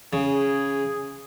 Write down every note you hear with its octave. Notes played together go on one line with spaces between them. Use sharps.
C#3 G#4